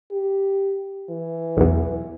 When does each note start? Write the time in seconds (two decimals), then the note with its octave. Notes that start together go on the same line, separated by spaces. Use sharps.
0.12 G4
1.10 E3
1.57 B1 E2